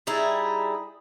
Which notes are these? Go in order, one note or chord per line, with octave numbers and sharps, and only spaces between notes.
G3 D#4 E4 G#4